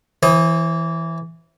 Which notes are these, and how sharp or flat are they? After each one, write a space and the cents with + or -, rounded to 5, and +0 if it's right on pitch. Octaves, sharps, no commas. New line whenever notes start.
E3 +0 C5 +40 D#6 +0